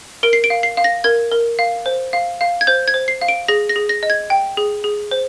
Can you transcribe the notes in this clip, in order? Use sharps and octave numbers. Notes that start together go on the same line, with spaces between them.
A#4 D7
C7
D7
F5
C7
F5
A#6
A#4 G#6
A#4
F5
C5
F5
F5
G#6
C5 G6
G#6
C5
C7
F5
D7
G#4 A#6
A#6
G#4
A#6
D#5
G#6
G5
G#4
G#4
C5